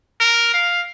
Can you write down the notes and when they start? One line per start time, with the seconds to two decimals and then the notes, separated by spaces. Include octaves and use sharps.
0.20 A#4
0.54 F5